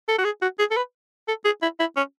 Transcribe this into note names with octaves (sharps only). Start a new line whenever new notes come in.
A4
F#4
G#4
F#4
G#4
A4
B4
A4
G#4
E4
E4
C#4